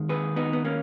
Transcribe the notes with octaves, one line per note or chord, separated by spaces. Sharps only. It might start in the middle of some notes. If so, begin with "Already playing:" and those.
Already playing: D#2 D#3 G#3
G#4 B4
B3 D#4
B3
A#3 C#4